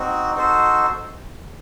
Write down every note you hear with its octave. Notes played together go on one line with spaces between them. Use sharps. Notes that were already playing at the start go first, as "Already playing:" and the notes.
Already playing: C4 D#4 F#4
D#4 F#4 A4 C5